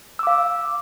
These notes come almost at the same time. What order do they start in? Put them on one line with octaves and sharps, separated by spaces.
E6 D6 F5